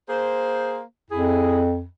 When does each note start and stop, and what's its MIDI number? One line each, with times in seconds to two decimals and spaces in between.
0.08 0.80 58
0.08 0.80 68
0.08 0.80 72
1.10 1.86 41
1.10 1.63 64
1.10 1.63 68